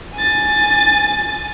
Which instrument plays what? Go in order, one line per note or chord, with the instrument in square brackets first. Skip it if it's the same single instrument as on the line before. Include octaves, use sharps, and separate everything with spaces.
[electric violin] G#5 A6